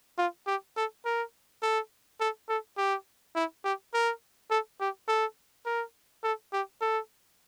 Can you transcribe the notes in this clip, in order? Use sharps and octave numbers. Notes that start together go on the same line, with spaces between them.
F4
G4
A4
A#4
A4
A4
A4
G4
E4
G4
A#4
A4
G4
A4
A#4
A4
G4
A4